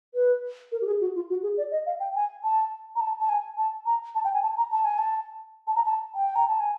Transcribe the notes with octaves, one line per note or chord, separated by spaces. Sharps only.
B4
A#4
G4
G#4
F#4
F4
F#4
G#4
D5
D#5
F5
G5
G#5
A5
A#5
A5
A5
G#5
A5
A#5
A5
G5
G#5
A5
A#5
A5
G#5
A5
A5
A#5
A5
G5
A#5
A5
G#5